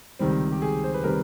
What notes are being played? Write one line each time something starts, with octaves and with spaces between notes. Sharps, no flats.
C#2 C3 D#3 G3 C4
G4
G#4
C5
B4
C3 D#3 G3 C4 A#4